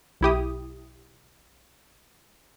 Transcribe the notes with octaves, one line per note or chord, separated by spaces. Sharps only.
B1 E4 G4 D#6